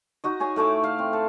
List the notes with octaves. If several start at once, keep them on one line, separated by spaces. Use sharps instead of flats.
D#4 F#4 D#5
G#4 C#5 G#5
A2 A3 E5 D6
F5
C4
A4